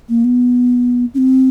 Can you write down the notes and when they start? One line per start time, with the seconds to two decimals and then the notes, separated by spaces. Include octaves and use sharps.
0.09 A#3
0.24 B3
1.14 C#4
1.18 C4